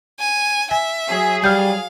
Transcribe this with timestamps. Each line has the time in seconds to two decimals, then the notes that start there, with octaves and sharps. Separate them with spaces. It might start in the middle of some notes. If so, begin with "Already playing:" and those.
0.20 G#5
0.71 E5 G#5
1.09 F#3 G#4
1.44 G3 F5 F6 G6